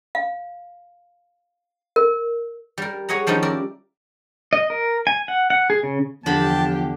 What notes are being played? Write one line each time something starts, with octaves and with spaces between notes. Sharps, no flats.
F5
A#4
G3 A#4
G#4 C#5 D#5 F#5 A#5
D#3 F3 G3 C#4 D#4
A#4 D5 E5
D#5
A#4
G#5
F#5
F#5
G#4
C#3
E2 D3 F3 G4 A5 B5